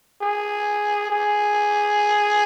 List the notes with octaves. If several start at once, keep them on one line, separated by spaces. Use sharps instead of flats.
G#4
G#4